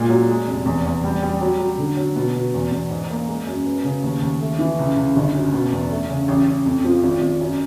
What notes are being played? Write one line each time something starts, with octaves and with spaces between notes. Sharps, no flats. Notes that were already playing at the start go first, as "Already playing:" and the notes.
Already playing: A#2 G#3
F#3
G#3
F1
E2
E2
G3
G3
F#3
F#3
D3
F#3
B2
B2
E2
E2
G#2
A#3
G#3
F#2
B3
C#3
D#2
D#2
A3
E3
C#2
C#2
G1
F#2
B2
E2
A3
C#3
A1
A1
F2
F3
G#1
G#1
F#2